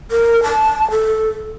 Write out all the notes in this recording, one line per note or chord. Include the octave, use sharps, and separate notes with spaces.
A#4
A5
A4